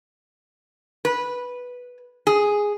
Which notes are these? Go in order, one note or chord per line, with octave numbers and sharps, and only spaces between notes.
B4
G#4